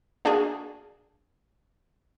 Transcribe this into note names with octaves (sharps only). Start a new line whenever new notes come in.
A#3 D4 F#4 G#4